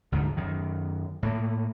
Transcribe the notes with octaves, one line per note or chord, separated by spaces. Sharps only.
D2 G#2 D3 D#3
F#2 D#3
A2 A#3